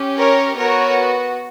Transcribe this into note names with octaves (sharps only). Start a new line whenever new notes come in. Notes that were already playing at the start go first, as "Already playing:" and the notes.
Already playing: C#4 G4
A#4 C#5
B3 F#4 A#4 C#5